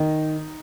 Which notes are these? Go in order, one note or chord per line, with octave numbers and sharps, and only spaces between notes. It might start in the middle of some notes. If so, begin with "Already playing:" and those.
Already playing: D#3 D#4